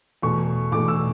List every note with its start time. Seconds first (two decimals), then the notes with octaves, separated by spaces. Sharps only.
0.22 E2 B2 A3 C#6
0.72 E2 B2 A3 D6
0.88 E6